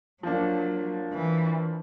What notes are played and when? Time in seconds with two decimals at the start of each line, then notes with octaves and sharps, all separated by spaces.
0.23 F3 F#3 A#3 D4
1.13 E3